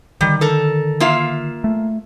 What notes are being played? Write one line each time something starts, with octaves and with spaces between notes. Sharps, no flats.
D3 D#3 G3
A4 A#4
A#3 F4 E5
A3